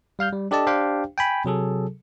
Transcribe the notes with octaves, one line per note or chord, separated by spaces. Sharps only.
G3 F5 F6 G6
G3
D4 G4 A4 D5 D#5 A5
D4 G4 C5 F5 G5
G5 G#5 B5
C3 F#3 G#4 A4